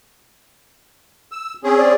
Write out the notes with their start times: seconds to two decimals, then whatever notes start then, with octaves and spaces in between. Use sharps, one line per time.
1.32 E6
1.64 C4 C#4 G#4
1.77 D5